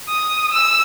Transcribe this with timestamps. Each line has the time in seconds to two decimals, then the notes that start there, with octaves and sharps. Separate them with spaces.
0.08 D#6
0.53 E6